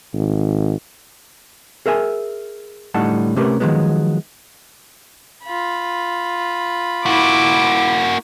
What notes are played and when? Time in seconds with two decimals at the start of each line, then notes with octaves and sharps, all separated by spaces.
0.13 G#1
1.86 G#4 A#4 E5 F5 G#5
2.94 A2 D3 G3 D#4 F#5 A5
3.36 C3 A3 C#4 G4 A#4 B4
3.60 D#3 F3 F#3 G#3 B3
5.43 F4 B5
7.06 A#3 E4 F#4 D6